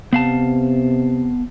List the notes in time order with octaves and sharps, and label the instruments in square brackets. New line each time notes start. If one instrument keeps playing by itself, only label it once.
[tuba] C3 [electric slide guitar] B3 F5 A5